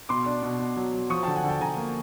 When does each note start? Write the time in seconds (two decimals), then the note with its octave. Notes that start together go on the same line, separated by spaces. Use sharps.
0.09 B2 C6 D6
0.26 D4
0.43 B2
0.59 B2
0.77 F#3
0.94 F#3
1.10 F3 C#6 D#6
1.23 D3 G5 A5
1.35 F#5 G#5
1.44 D3 G5 A5
1.61 D3 G#5 A#5
1.77 A#3